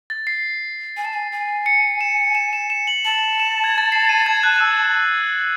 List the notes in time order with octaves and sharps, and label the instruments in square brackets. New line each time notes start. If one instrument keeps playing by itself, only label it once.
[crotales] A6
C7
[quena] G#5
A5
G#5
G#5
[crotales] C#7
E7
E7
E7
E7
F#7
[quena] A5 [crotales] F#7
[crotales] E7
G#6
A6
C7
D#7
G#6
F#6
F#6
E6